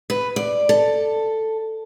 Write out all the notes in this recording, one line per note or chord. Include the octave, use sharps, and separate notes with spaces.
B4
D5
A4